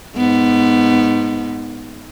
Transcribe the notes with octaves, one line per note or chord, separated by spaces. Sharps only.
G#2 B3